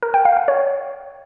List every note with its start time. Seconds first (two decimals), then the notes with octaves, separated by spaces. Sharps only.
0.03 A#4
0.14 G5
0.25 F5
0.37 F#5
0.48 C#5